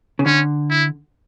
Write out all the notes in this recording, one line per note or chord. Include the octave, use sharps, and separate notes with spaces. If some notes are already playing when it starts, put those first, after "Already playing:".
C#3
D3 C#4
E4